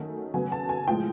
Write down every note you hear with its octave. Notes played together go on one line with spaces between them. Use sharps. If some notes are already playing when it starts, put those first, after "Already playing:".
Already playing: D#3 F#3 A3 C#4
C#3 F#3 B3 G#5
A5
G#5
A2 F3 G#3 G5